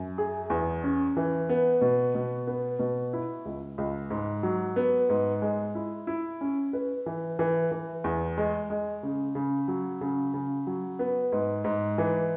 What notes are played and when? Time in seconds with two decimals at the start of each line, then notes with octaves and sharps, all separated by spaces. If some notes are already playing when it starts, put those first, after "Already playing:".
Already playing: F#2
0.18 G#4
0.50 E2
0.84 C#4
1.17 E3
1.49 B3
1.81 B2
2.15 B2
2.47 B3
2.79 B2
3.13 E4
3.45 C#2
3.78 C#2
4.10 G#2
4.43 F#3
4.76 B3
5.09 G#2
5.42 G#3
5.75 E4
6.07 E4
6.41 C#4
6.73 B4
7.06 E3
7.39 E3
7.71 E3
8.04 E2
8.38 G#3
8.70 G#3
9.03 C#3
9.35 C#3
9.68 F#3
10.01 C#3
10.34 C#3
10.67 F#3
10.99 B3
11.32 G#2
11.64 G#2
11.98 E3